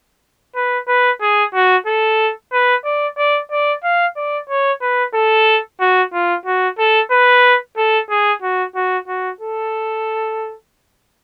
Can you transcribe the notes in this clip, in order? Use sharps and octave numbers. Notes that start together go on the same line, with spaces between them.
B4
B4
G#4
F#4
A4
B4
D5
D5
D5
F5
D5
C#5
B4
A4
F#4
F4
F#4
A4
B4
A4
G#4
F#4
F#4
F#4
A4